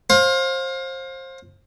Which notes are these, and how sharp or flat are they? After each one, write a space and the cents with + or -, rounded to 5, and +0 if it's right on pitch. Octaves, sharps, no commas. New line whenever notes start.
C5 +25 F5 +25